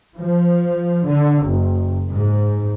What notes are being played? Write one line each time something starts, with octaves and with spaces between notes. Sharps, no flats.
F3
D3
F#1
G#2